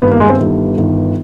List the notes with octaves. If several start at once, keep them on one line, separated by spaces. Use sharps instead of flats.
G1 G2 D#3 B3
A#3
G#3
C4
G1 G2 D#3
G1 G2 D#3